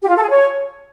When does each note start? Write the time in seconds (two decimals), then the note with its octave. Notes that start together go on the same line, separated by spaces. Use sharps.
0.02 G4
0.09 F4
0.16 A4
0.23 G#4
0.30 C#5